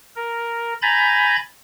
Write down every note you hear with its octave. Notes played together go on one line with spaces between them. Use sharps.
A#4
G#5 A#5 B5 G6 A6